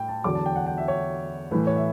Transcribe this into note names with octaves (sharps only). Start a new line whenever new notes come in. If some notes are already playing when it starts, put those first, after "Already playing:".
Already playing: A2 G5
A5
E2 D3 F#3 D6
A5
G5
F#5
G5
E5
C#5
A2 E3 B4
C#5
E5